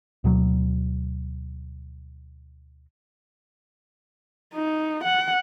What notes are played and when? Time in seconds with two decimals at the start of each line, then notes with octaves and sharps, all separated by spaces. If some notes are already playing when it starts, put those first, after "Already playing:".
0.24 D2 B2 F#3
4.54 D#4
5.04 F#5